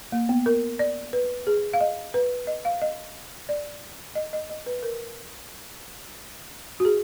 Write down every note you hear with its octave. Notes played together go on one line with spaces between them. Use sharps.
A#3
B3
A#4
D5
B4
G#4
F5
D#5
B4
D#5
F5
D#5
D5
D#5
D#5
D#5
B4
A#4
F#4
G#4